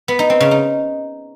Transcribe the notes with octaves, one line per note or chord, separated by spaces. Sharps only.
B3
D#4
C4
C#3
D#4